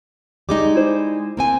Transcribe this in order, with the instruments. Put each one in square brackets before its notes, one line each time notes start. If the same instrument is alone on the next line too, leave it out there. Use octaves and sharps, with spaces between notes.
[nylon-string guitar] G3 G#3 D#4 [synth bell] D6
[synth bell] E4 C5
[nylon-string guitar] A#3 C4 G#5